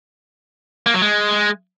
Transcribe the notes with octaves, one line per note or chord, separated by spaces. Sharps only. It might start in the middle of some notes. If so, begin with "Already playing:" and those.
A#3
F#3
G#3